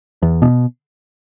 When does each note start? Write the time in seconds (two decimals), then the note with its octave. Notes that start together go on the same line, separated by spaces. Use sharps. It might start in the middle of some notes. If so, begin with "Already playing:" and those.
0.22 E2
0.42 B2